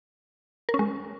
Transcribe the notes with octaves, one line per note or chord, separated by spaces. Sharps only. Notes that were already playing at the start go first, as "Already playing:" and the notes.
A#4
C#4
G#3